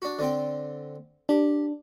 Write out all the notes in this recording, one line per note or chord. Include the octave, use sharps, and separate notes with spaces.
D4 F#4
D3 C4 G5
D4 G4